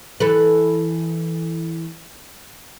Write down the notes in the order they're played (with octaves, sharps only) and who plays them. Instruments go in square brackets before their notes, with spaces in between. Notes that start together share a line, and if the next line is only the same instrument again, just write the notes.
[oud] E3 A4 B4